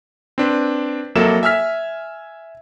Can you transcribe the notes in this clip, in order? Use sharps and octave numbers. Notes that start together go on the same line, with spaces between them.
C4 D4 B4
F2 F#3 A#3 A4 E5 E7
E5 G#5 E6 F6 B6